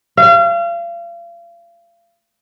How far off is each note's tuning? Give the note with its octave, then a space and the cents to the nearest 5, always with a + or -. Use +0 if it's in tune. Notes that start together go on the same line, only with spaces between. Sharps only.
F5 -35